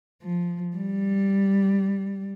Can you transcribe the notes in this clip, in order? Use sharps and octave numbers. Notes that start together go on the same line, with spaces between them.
F3
G3